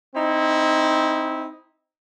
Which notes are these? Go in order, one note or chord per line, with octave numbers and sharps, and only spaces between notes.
C4 D#4 E4